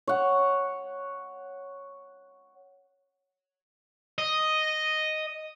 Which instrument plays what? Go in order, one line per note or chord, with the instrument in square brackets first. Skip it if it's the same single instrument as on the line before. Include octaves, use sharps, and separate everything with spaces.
[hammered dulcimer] C#5 F#5
[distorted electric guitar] D#5